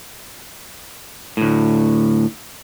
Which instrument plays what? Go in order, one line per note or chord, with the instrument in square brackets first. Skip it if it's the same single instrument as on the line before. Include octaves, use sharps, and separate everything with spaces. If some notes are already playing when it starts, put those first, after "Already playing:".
[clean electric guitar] D2 A2